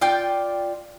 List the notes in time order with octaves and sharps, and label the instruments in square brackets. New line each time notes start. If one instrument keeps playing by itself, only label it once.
[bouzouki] F4 D5 G5